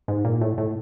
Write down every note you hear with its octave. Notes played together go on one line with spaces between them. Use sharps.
G#2
A#2
A2
A2